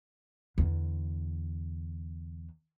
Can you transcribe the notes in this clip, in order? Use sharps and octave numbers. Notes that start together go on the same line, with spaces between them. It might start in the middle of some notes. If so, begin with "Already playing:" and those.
E2 D3